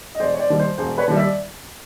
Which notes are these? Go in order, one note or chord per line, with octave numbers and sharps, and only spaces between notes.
D#5
E1 C5 D5
C#5
C5 D5
D#2 D#3 G3
C5
E1 C5
B4 C#5
D#2 D#3 G3
D5 E5